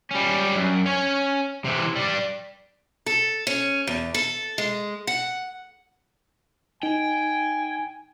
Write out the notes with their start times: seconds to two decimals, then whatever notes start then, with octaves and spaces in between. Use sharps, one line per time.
0.11 G3 C#4
0.55 F#2
0.86 C#4 C#5
1.65 C3 E3
1.95 G3 D4
3.06 A4
3.47 C#4
3.87 E2
4.14 A4
4.58 G#3
5.07 F#5
6.83 D#4 G5 G#5